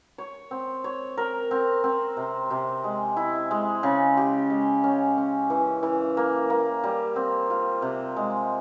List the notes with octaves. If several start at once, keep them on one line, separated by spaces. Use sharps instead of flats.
C#5
C4
C#5
A#4
C4
C4
C3
C3
G#3
E4
G#3
C#3
G4
G#3
C#4
C#4
E3
E3
A#3
A#3
G3
C4
F4
C3
G#3